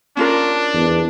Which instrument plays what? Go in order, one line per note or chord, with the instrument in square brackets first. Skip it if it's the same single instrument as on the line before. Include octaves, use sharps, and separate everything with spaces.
[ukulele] C#4 F4 A#4 [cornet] D4
[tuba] E2